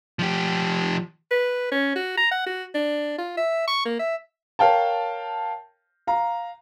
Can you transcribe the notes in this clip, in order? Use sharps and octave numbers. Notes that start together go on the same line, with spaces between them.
F3 G4
B4
C#4
F#4
A#5
F#5
F#4
D4
F4
E5
C#6
A#3
E5
A#4 C#5 F5 G5 A5
F5 A#5